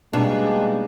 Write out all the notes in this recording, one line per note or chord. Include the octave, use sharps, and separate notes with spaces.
B2 G3 G#3 A#3 D4 D#4